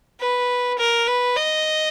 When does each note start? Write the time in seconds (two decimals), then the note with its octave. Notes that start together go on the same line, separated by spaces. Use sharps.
0.20 B4
0.78 A#4
1.07 B4
1.36 D#5